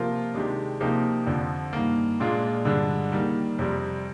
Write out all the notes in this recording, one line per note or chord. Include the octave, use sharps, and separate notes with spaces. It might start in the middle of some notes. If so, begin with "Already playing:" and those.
Already playing: C3 F3 A#3 F4 A#4
C3 D#3 G#3 D4 G4
C3 F3 A#3 D#4 G4
F2 D3 F3
G2 D#3 A#3
A#2 G#3 D4 F4
G2 D3 G#3 D4
D#3 G3 A#3
F2 C3 G3